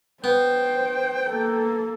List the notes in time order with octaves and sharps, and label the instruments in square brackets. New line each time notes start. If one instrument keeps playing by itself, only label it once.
[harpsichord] B3 [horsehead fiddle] C5 [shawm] G5
[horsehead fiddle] A#3 A4